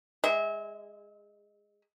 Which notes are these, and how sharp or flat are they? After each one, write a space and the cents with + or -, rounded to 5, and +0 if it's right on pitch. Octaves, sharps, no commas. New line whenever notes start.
G#3 -15 E5 -35